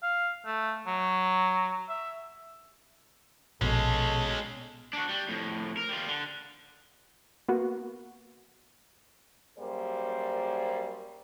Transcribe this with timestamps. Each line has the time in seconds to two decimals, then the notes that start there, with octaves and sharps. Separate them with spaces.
0.03 F5
0.46 A3
0.87 F#3
1.89 E5
3.61 A#1 B2 G#3 C#4 A4 A5
4.93 D4 F#4
5.09 G3
5.29 F2 A2
5.77 A#4
5.89 G3 F4
6.07 D3
7.49 A#3 B3 F#4
9.58 F#2 G3 A#3 G#4 C5 D5